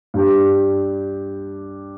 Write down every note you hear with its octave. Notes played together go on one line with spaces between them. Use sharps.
G2 G3 D4 G4